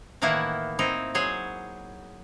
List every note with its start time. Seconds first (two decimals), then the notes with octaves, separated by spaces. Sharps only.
0.22 A2 D#3 E3 A#3 E4 F#5
0.79 C4 D#4 E4
1.15 F#3 G#4 C5 C#5